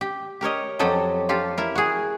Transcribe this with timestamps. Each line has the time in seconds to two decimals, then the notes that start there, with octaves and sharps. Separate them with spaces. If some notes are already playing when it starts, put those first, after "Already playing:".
0.01 G4
0.41 G4 A#4 C#5 D#5
0.79 F2 F#3 G4 A4 D#5
1.29 F4 G4 A4
1.58 E4 A#4
1.75 F#4 G#4